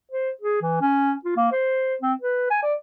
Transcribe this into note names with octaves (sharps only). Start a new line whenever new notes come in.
C5
G#4
E3
C#4
F4
A#3
C5
C4
B4
G#5
D5